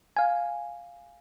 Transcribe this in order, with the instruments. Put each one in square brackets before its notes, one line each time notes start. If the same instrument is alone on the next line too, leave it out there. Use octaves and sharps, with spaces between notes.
[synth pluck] F5 G#5